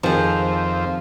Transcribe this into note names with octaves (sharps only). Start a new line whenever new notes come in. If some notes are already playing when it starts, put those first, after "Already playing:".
F2 D#3 F3 G#3 C4